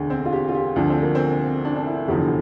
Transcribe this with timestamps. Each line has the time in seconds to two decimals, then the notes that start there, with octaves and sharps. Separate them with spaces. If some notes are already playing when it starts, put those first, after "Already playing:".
Already playing: E1 D2 D3
0.10 C4
0.25 F4
0.33 G4
0.49 F4
0.55 G4
0.76 D2 D3 F3 D4
0.90 C4
1.02 A#3
1.15 C4
1.65 D4
1.76 D4
1.86 E4
2.08 F1 E2 D3 F3 G4